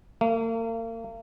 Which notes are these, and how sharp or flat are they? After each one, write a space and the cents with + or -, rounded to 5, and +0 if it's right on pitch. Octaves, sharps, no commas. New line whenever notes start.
A#3 -40